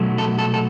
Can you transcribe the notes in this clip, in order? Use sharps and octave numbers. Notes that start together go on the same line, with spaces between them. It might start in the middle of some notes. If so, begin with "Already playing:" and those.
Already playing: B2 F#3 A3
A4
A4
A4